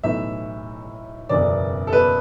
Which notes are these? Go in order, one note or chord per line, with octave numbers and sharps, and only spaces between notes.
B1 A2 E3 E5
F#1 E2 B2 D5
A4
B4